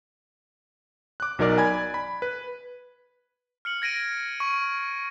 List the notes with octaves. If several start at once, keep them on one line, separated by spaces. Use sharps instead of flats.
D6 F#6
B1 F#3 D#4 A#4 D5 D6
D5 G#5 B5 G#6
B5
B4
F6 C#7 F#7
G#6 A#6 D7 D#7
C#6